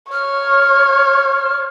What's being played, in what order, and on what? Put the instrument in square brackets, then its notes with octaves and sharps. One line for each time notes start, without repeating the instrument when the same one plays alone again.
[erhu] C#5 [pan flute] F6